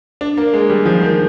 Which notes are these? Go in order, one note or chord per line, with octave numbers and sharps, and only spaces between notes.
D4
A#3
G#3
G3
F3
D#3